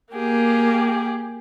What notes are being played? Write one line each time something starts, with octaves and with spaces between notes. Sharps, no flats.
A#3 G4 G#4